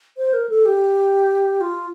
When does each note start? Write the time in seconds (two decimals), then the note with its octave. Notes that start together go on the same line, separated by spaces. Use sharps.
0.17 C5
0.33 A#4
0.49 A4
0.65 G4
1.61 F4